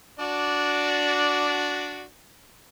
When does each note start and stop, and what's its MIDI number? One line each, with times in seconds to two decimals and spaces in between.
0.19 2.04 62
0.19 2.04 66
0.19 2.04 74